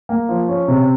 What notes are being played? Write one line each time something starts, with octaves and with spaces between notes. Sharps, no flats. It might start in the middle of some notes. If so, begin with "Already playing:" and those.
A#3
F3
C#4
C3